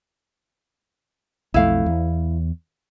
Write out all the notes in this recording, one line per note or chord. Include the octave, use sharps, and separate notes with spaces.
B1 F2 A3 E4 F5
E2